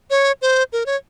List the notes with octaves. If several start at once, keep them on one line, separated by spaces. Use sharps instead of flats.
C#5
C5
A#4
C#5